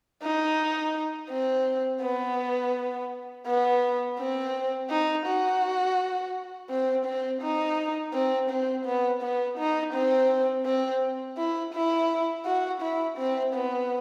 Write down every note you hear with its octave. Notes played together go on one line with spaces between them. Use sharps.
D#4
C4
B3
B3
C4
D#4
F#4
C4
C4
D#4
C4
C4
B3
B3
D#4
C4
C4
E4
E4
F#4
E4
C4
B3